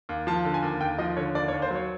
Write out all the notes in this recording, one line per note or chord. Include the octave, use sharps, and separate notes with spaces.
D#2
F3 A5
D3
G#5
D#2
D#2 G5
F3 D#5
D3 C#5
D#2 D5
C#5
D#2
C5
F#3
C#5